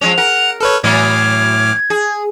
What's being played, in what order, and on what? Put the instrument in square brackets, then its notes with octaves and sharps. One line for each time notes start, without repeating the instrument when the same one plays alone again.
[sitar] F3 G#3 C#4 [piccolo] F7
[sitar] A#4 [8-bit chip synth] F#5
[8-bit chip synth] A4 B4 C#5 [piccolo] F6
[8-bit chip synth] A2 D6 F6 [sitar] E3 F#3 B3 [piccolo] G#6
[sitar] G#4